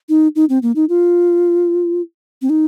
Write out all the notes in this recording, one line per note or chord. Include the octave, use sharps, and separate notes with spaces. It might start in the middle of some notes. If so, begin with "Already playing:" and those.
D#4
D#4
C4
A#3
D#4
F4
C4
D#4